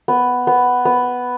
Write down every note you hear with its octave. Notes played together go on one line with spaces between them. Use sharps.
B3
B3
B3